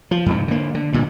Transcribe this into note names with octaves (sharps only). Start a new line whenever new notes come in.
F3
F2 G#2 C3
D3 A#3
D3
G2 A#2 D3